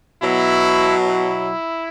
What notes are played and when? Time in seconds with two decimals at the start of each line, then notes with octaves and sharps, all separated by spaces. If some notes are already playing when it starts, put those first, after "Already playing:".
0.22 B2 F#3 E4
1.03 E4